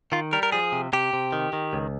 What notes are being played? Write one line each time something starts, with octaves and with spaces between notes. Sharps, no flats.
D#3 F4
G3 A#4
A#4
F3 G#4
C3
C3 G4
C3
D#3
D#3
C#2